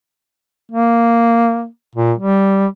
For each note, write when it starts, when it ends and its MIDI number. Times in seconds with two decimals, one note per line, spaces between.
0.72 1.67 58
1.95 2.13 46
2.18 2.66 55